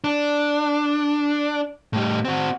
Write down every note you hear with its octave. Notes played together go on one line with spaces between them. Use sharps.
D4
A2 G3
C4 F#4